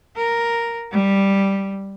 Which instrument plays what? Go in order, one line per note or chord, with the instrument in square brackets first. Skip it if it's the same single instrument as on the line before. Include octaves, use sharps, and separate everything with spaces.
[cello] A#4
G3